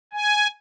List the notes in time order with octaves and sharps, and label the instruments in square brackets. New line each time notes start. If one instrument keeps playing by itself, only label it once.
[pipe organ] G#5